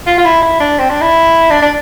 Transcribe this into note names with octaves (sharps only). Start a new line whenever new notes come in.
F4
F4
E4
E4
D4
C4
D4
E4
D4
D4